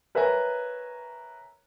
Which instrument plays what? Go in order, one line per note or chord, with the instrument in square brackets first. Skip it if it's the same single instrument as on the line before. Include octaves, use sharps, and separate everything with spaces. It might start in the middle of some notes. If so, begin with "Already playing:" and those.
[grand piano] A#4 B4 C#5 E5 G#5 A#5